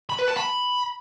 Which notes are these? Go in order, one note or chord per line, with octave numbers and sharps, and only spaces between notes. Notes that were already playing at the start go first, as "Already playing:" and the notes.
B5
B4
A5
B5